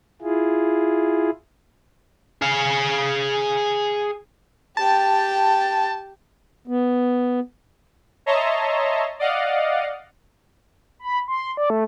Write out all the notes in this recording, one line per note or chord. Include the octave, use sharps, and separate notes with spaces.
E4 F4 G#4
G#4 F5
G4 G5 A5
B3
C#5 D#5 E5 A5 A#5 C6
D5 D#5 F5 F#5
B5
C6
D5
A3